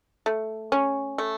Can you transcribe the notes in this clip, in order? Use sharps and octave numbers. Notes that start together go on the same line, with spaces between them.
A3
C#4
A3